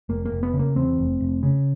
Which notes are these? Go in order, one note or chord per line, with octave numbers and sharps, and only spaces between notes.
F1 A#3
A#3
F1
B3
C#3
A#3
E2 C4
F1
F1
C#3